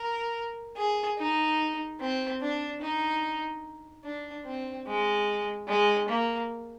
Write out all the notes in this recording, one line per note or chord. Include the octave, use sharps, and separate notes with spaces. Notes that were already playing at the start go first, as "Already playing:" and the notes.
Already playing: A#4
G#4
D#4
C4
D4
D#4
D4
C4
G#3
G#3
A#3